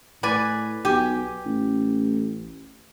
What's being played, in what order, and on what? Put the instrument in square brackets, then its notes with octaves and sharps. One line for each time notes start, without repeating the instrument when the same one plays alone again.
[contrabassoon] A2 [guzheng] B4 D5 G#5
[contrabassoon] B1 [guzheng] G4 G#5
[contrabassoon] A1